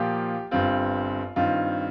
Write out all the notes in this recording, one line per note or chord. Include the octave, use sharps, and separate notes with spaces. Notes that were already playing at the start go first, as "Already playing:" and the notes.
Already playing: A#2 F3 A#3 F4 G4
G1 G2 G3 C4 F4
G2 D#3 C4 F4